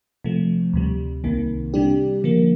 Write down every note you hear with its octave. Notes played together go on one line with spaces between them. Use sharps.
C3 F3 A3
D2 C3 G3
C2 C3 D#3 A#3
C3 G3 D4 G4
D3 F3 A#3